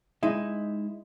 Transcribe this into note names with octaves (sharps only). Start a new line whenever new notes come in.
G#3 D#4 E4